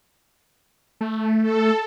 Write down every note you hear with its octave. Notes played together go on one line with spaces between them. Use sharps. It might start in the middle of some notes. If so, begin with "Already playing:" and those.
A3
A4